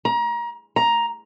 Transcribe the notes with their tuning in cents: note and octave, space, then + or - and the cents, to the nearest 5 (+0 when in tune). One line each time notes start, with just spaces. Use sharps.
A#5 +30
A#5 +10